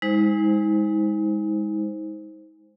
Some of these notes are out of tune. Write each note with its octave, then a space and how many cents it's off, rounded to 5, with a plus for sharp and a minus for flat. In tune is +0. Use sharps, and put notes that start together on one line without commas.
G#3 -20 D#4 +40 C5 +0